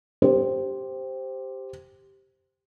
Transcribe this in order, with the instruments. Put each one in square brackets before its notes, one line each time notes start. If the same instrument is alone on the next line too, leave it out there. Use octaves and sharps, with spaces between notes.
[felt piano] G4 C5